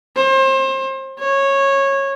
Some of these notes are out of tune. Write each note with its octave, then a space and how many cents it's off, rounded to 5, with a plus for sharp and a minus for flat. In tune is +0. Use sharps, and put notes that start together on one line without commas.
C5 +30
C#5 -15